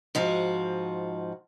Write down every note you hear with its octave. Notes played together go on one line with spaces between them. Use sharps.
G#2 F3 F#4